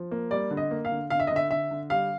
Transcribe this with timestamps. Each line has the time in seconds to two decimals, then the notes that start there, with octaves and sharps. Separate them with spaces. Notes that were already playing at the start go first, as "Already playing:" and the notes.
Already playing: F3
0.11 A#3
0.31 G3 D5
0.51 D3
0.57 D#5
0.71 A#3
0.85 F5
0.92 D3
1.10 D3 F5
1.20 E5
1.27 D3 D#5
1.36 E5
1.51 D3 E5
1.71 D3
1.90 G3 F5